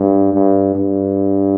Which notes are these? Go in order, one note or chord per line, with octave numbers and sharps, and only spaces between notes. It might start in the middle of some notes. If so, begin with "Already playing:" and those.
Already playing: G2
G2
G2